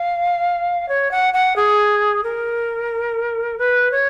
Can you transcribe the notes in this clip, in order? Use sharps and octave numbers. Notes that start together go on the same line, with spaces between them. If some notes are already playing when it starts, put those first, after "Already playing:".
Already playing: F5
C#5
F#5
F#5
G#4
A#4
B4
C#5